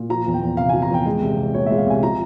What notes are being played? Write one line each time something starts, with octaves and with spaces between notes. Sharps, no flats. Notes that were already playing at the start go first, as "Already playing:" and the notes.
Already playing: A#2
F3 A#5
E2
G5
E2
C3 F5
F3 G#5
A#5
E2 G5
G#3
C2
C2
A#2 C#5
G#3 E5
F5
C2 G#5
F3 A#5